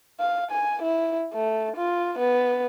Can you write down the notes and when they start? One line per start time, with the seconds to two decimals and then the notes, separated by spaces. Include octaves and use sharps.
0.20 F5
0.51 G#5
0.83 E4
1.33 A3
1.77 F4
2.19 B3